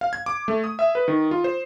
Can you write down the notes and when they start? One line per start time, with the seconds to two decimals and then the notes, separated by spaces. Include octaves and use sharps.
0.01 F5
0.13 G#6
0.26 D6
0.48 A3
0.64 D#6
0.79 E5
0.95 B4
1.08 D#3
1.31 F4
1.44 C5